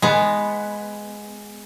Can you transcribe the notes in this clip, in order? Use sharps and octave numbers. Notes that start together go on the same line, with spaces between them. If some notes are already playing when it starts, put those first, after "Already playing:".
G#3 B3